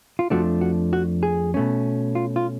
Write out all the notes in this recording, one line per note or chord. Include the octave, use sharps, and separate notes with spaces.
F4
F2 F3 A3 D4 F#4
F#4
F#4
G#4
B2 A3 C#4
F4
F4